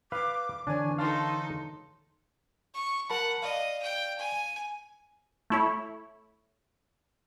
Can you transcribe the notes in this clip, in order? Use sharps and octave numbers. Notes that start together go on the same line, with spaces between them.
B4 F5 D6
D3 E3 D4 C#5 G#5
D#4 A4 F5 A5 C6
C#6
A#4 F#5 A5 B5
D5 D#5 F5
G5
G#5
A3 E4 C#5